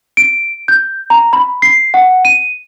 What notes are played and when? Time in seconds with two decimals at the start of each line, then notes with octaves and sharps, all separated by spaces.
0.17 D7
0.68 G6
1.10 A#5
1.33 B5
1.62 C7
1.94 F#5
2.25 D#7